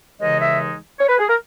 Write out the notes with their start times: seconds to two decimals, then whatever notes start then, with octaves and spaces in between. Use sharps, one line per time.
0.20 D#2 C#3 E3 G#3 D#4 D#5
0.40 E5
1.00 C#5
1.09 B4
1.19 G#4
1.29 A#4